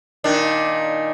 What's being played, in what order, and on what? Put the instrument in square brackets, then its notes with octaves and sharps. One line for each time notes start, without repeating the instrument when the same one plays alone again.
[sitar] A#2 D#3 D4